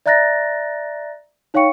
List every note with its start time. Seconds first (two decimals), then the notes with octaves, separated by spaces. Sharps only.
0.06 D5 E5 A#5 F#6 A6 A#6
1.54 D#4 C#5 F5 G5 C#6 C#7